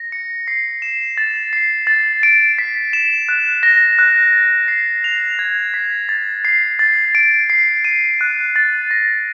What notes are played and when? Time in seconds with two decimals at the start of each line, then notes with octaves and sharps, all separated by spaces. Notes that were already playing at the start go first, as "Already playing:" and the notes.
Already playing: A#6
0.12 C#7
0.48 C7
0.82 E7
1.18 A6
1.53 C7
1.87 A6
2.23 D7
2.58 B6
2.93 E7
3.29 F#6
3.63 A#6
3.99 F#6
4.33 A6
4.68 C7
5.04 F7
5.39 G#6
5.74 B6
6.09 A6
6.45 C7
6.79 A6
7.15 D7
7.50 C7
7.85 D#7
8.21 F#6
8.56 A6
8.91 A#6